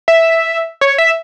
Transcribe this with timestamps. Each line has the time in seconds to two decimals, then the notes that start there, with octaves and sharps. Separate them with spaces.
0.08 E5
0.81 C#5
0.98 E5